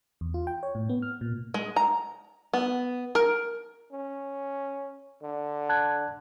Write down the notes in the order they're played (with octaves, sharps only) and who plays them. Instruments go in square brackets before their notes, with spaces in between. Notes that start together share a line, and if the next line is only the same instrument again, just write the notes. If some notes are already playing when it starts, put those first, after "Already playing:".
[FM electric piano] E2
F4
G5
C#5
A2
B3
F6
A#2
[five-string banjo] G#3
A#5
B3
A#4
[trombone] C#4
D3
[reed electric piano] A5 F#6 G#6